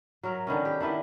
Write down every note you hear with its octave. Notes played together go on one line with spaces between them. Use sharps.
F#3 F#4 A#4 E5
D3 D#3 B3 C#4
G4
D#3 D4 E4 B4